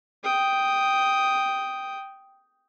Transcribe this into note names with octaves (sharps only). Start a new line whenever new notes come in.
G5 D#6